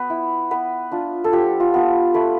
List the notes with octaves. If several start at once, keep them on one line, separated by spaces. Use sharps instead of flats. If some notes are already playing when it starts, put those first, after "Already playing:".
Already playing: B3 B4
E4
B3 B4
D4 F4
A4
F3 G4
F4
B3 F4
A3 B4